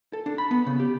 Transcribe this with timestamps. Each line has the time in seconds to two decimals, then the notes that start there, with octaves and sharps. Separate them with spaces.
0.13 A4
0.26 D4
0.38 B5
0.51 B3
0.66 C#3
0.80 G4